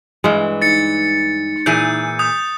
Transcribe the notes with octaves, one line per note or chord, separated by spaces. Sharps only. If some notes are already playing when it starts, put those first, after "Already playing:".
G2 E3 G#3
D#4 A6 C#7
A#2 E3 G#4 G6
D#6 G6